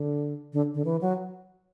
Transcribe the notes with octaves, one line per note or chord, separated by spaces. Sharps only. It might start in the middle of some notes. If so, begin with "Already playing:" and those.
Already playing: D3
D3
D3
E3
F#3